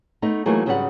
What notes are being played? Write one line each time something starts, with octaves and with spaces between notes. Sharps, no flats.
A3 B3 D#4
E3 F#3 A3 A#3 D#4 G#4
G#2 C#3 F#3 G3 B4 F#5